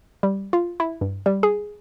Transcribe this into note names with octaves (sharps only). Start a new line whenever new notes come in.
G3
F4
E4
G2
G3
G#4